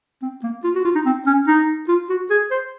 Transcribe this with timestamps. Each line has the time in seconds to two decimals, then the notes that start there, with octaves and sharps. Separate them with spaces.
0.22 C4
0.43 A#3
0.64 F4
0.75 F#4
0.85 F4
0.95 D#4
1.05 C4
1.26 C#4
1.47 D#4
1.88 F4
2.10 F#4
2.30 G#4
2.51 C5